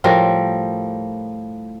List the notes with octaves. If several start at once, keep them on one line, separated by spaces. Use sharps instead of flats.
A2 F3 G3 A#4